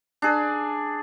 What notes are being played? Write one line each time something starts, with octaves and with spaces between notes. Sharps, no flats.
D4 G#4